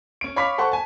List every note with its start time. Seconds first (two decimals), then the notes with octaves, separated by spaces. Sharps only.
0.21 C#4 D7
0.36 C#5 F5 B5 C#6 D6 B6
0.58 A4 C5 F#5 C6 C#6
0.72 G#5 A5